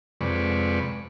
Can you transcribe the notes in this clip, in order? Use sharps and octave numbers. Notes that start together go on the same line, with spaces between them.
F2 C3 G#3 B4 D5 C#6